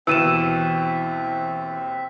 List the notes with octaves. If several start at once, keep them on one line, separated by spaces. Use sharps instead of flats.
D#2 B2 E3 C4 E5 E6 D#7 E7